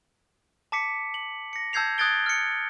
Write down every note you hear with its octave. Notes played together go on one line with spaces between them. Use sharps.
A5 D6 B6 C#7
F#7
A#6 C#7
A5 E6 G6 G#6 C7 F7
D#6 F#6 G#6 A6 D7 G7
F6 C#7